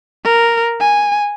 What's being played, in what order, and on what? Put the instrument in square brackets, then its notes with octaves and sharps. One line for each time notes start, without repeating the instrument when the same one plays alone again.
[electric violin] A#4
G#5